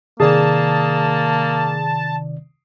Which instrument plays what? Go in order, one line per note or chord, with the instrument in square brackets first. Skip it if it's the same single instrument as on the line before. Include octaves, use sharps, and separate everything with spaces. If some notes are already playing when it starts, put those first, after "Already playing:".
[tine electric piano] C3 D#3 D5 [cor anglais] A#3 [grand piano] G#4 [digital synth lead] A5